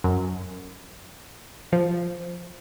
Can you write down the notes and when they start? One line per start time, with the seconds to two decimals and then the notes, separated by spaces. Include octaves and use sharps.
0.04 F#2
1.73 F3